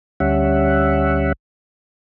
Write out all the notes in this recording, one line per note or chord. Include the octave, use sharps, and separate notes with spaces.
D2 G3 C#4 E5 F#5